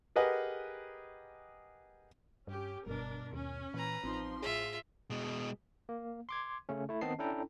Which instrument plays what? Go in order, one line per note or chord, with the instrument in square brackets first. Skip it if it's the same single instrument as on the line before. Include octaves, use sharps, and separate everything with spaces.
[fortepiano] G4 G#4 A#4 B4 D#5 F#5
[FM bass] G2 [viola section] C#4 G4
[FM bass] F#1 [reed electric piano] G2 B2 [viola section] D4 A#4
[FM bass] D#2 [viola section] C#4
[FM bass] A#2 [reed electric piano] E3 [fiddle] B4 A#5
[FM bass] A1 [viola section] F3 C6 [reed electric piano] C4 D#4
[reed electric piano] A2 G#4 [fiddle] F4 E5
[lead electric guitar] B2 G#3
[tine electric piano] A#3
C6 D6 G#6
C#3 A3 C#4
A3 E4
D#3 B3 C4 D#5 A5 C7
C#4 D4 E4 A4 G5 A#5